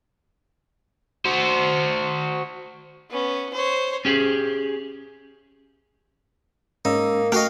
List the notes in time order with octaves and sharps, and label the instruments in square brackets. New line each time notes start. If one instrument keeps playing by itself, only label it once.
[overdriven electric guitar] F#4 C5
[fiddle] B3 C#4
C5 C#5
[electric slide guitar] C#4 G4 G#4
[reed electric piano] G#2 C#4 E6 [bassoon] A#3 [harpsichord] D#4
[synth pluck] A3 F#4 [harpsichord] D#5 F5 G5 [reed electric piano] C#6 F6